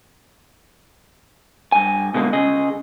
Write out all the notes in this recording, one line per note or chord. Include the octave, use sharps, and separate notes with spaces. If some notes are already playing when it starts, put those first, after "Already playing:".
G2 G#5
B2 D3 G#3 A#3
C#3 G#4 D#5